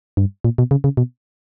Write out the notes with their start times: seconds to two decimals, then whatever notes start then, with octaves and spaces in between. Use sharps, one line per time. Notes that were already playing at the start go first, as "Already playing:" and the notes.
0.17 G2
0.44 A#2
0.58 B2
0.71 C#3
0.84 C#3
0.97 B2